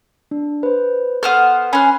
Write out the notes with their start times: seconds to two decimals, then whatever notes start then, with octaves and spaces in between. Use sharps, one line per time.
0.31 D4
0.63 B4 C5
1.23 B3 A4 C5 F#5 F6
1.73 C#4 B5 C6 F#6